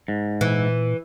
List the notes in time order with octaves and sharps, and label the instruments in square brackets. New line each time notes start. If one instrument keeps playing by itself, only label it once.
[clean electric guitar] G#2
[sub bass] A#2 [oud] E3